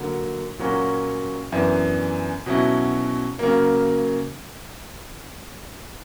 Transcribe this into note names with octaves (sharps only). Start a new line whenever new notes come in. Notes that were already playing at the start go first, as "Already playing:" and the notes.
Already playing: D3 F#3 A#3
A#2 F#3 A#3 C#4 F#4
F#2 E3 B3 D4
B2 F#3 C#4 E4
C#3 F#3 A#3